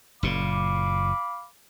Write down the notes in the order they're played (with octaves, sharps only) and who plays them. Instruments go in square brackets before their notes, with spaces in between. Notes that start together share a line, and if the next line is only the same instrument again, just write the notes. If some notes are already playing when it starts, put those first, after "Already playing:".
[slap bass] F#1 A#2 [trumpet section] F5 B5 D6